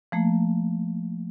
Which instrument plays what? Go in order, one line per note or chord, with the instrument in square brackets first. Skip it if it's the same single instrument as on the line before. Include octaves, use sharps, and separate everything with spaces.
[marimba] F3 A3 A#3